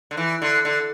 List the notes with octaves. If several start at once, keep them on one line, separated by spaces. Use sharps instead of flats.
D3
E3
D3
D3